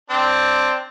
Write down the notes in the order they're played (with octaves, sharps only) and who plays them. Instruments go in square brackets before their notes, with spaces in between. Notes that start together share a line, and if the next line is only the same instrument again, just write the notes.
[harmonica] C4 D4